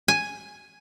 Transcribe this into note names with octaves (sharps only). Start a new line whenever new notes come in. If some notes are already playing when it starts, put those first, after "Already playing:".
G#5